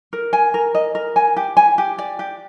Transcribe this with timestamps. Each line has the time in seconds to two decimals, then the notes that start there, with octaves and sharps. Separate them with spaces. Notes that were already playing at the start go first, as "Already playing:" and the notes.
0.13 A#4
0.33 G#5
0.54 A#4
0.75 D#5
0.95 A#4
1.16 G#5
1.37 G4
1.57 G#5
1.78 G4
1.98 D5
2.19 G4